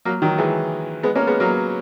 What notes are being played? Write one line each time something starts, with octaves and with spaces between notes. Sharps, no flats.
F#3 A#3
D#3 F#3
E3 G#3
G#3 B3
A#3 C#4
G#3 B3
F#3 A#3